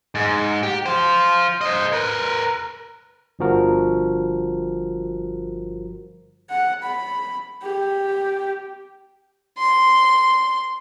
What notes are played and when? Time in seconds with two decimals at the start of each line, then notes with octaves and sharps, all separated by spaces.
0.15 G#2
0.63 G4
0.86 F4 C5
1.61 C5 D#5
1.92 A#4 B4
3.39 G1 G2 F3 F#4 A#4
6.50 F#5
6.83 B5
7.63 G4
9.58 C6